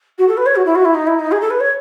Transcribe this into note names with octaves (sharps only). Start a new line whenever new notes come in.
F#4
A4
B4
C#5
F#4
E4
F#4
E4
D#4
E4
D#4
G#4
A4
B4
C#5